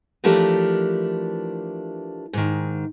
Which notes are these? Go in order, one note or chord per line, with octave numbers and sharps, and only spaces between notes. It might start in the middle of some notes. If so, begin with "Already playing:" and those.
E3 F3 A3 D4 G4 A#4
G#2 D#3